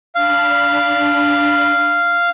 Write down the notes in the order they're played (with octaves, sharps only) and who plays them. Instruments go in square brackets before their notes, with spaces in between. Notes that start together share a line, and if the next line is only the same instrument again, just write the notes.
[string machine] D4 B5 [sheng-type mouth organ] F5